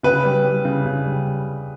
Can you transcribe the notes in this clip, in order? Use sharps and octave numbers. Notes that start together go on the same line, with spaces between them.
C#3 B4
G3
G3
C#3
C#3
G3